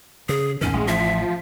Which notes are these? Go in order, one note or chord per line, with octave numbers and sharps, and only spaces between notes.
C#3 G#4
E2 A2 D#3 C#4
A1 G#3
F3 E5